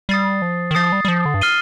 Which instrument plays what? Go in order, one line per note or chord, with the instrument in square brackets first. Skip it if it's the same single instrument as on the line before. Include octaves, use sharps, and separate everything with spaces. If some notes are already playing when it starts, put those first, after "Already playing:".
[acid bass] G3 [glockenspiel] D#6 A6 C7
[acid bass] F3
D#3
[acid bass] F3 [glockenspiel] D#6 A6 C7
[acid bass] G3
G3
F3
D3
G2
[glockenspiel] F6 C7 D#7 G7